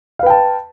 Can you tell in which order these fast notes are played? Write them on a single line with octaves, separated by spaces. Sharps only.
F5 B4 G5 A5